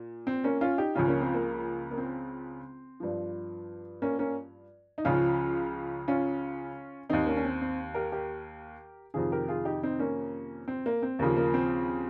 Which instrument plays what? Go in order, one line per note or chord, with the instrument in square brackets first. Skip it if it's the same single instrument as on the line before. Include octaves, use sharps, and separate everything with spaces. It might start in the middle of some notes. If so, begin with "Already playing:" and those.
Already playing: [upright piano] A#2
C4
A#3 C#4
C#4 F4
D#4 G4
C#2 C#3 F3 C#4 F4
A#3 C#4
C4
A#3
A#3
C4
G2 F3
A#3 C#4
A#3 C#4
D#4
C#2 C#3 F3 C#4 F4
C#4 F4
D#2 D#3 C4 D#4
A#3 C#4
C#4
C4
C4
G4 A#4
G4 A#4
F2 C3 D#3 F4 G#4
G4 A#4
F4 G#4
D#4 G4
C4 D#4
A#3 C#4
C4
A#3
C4
D#2 C#3 F3 A#3
A#3
C4